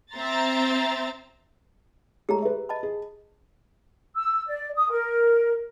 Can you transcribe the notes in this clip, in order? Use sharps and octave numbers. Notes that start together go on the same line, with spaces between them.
C4 E5 A#5 C6 A6
G#3 A3 G4 G#4 C#5 A#5
B4 E5
D#5 A5 B5
G#4
E6
D5
D#6
A#4